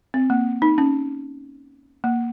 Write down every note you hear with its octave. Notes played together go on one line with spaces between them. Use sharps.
C4
A#3
D#4
C#4
A#3